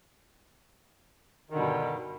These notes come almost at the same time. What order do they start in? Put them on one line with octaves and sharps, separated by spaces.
D#3 D3 B2 G3 G2